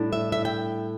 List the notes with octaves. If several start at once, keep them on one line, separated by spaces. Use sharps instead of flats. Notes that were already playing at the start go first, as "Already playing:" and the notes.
Already playing: A2 G3 D4
E5
E5
G5